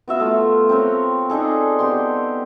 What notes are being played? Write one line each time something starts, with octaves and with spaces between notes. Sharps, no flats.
B3 F#4 E5 F5
A3 F4
C4 A#4 B4 C#5
D4 D#4 G#4 A4
B3 G4 C6